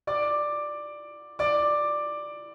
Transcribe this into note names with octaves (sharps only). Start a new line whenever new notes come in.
D5 D6
D5 D6